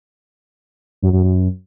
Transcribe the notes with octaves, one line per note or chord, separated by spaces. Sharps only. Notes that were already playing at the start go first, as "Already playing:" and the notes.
F#2
F#2
F#2